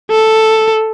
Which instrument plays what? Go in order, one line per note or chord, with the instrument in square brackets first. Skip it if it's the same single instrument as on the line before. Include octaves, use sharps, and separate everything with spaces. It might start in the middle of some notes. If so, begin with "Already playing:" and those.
[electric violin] A4